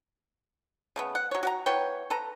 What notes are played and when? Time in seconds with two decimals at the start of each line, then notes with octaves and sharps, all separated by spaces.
0.96 C#3 A3 B3
1.15 F#5
1.31 F#3 C#5
1.43 F#4 F#5 A#5
1.66 E3 B3 C#5 G5
2.10 A4 B4 A#5